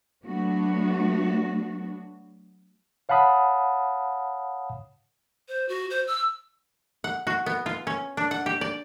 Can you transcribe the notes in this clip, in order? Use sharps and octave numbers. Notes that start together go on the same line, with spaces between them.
F#3 A3 B3 D4 F#4
C#5 F5 F#5 A5 B5 D#6
C5
F#4
C5
E6
F#5
F#4
B3
F4
C#4
D4
F#5
G4
D5